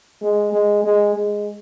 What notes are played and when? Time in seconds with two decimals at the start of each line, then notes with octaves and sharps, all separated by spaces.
0.22 G#3
0.52 G#3
0.84 G#3
1.14 G#3